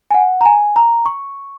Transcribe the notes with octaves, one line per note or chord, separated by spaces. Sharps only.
G#5
F#5
A#5
G#5
A#5
C#6